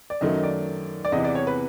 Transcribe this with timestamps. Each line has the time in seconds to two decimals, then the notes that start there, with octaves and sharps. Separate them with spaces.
0.10 D5
0.21 F#2 D#3 F#3 A3 D#5
0.35 D#5
0.43 D5
1.05 D5
1.12 E2 C3 E3 D#5
1.24 D5
1.35 C#5
1.47 B4